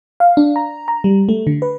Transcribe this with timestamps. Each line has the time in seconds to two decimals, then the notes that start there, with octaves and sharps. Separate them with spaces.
0.20 F5
0.37 D4
0.56 A#5
0.88 A#5
1.04 G3
1.29 A3
1.47 D3
1.62 B4